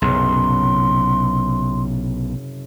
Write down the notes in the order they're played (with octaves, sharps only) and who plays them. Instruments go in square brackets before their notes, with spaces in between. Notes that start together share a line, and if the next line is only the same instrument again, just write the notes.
[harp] F#1 C3 [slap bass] B1 [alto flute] C6